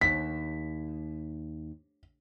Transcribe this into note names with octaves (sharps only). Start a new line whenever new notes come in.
D#2 B6